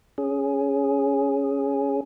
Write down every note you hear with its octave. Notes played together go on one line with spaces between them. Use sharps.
C#4 G#4